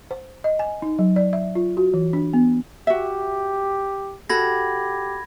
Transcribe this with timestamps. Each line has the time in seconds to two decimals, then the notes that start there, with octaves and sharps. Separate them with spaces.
0.11 C5
0.44 D#5
0.59 G#5
0.82 D#4
0.99 F#3
1.16 D5
1.33 E5
1.55 F4
1.77 F#4
1.94 E3
2.13 D4
2.33 B3
2.87 F#4 G4 E5
4.29 F#4 G4 A4 B5 G#6 A#6